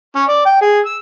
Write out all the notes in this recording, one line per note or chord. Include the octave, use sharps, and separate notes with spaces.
C#4
D5
G5
G#4
E6